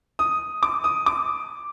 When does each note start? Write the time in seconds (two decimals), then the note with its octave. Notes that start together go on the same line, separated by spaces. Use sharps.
0.19 D#6
0.63 D6
0.84 D#6
1.06 D6